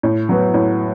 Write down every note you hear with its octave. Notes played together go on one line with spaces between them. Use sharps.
A2
F#3 B3
A2